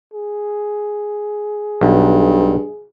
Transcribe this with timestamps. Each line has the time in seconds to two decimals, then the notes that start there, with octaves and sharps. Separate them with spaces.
0.14 G#4
1.81 B1 G2